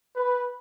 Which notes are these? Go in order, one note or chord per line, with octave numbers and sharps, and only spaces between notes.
B4